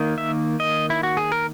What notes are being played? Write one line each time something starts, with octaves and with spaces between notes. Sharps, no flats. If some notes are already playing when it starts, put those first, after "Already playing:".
Already playing: D#3 A#3 D#4
E5
D#5
E4
F#4
G#4
A#4